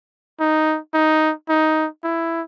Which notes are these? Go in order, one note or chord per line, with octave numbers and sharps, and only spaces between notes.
D#4
D#4
D#4
E4